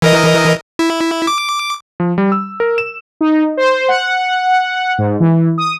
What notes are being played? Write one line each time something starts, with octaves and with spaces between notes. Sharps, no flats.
E3 A#4 D#5
E4
D6
F3
G3
E6
A#4
E7
D#4
C5
F#5
G#2
E3
D#6